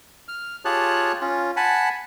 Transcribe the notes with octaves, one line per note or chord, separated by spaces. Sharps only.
F6
F4 G4 G#4 C#5 A5 F#6
C#4 F4
F#5 G#5 A5 B5